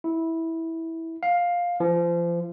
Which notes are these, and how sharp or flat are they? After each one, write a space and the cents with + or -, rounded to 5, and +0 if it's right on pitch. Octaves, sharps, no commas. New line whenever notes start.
E4 -15
F5 +10
F3 -30